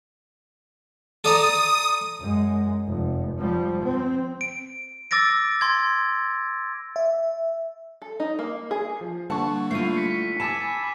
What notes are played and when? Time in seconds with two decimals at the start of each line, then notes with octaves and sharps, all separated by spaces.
1.24 A4 D5 A#5 D#6
2.19 F#2 G#3
2.87 F1
3.38 F3 G3
3.82 C4
4.41 D7
5.11 D6 E6 A6 A#6 D7
5.61 C6 G#6
6.96 E5
8.02 A4
8.20 D#4
8.39 A#3
8.71 G#4
8.97 F3 C7
9.30 D3 G3 A#3 D4 F#5 A5 C#6
9.71 A3 E4 F4 C7 D#7
9.97 B6 C#7
10.11 B6
10.40 G#5 A5 B5 D6 E6 A6 E7